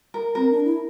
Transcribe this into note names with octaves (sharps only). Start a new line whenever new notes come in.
A#4
C4 A#4
D4
E4